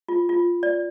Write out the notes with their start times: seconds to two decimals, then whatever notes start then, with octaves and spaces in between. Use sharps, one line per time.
0.08 F4
0.29 F4
0.63 D5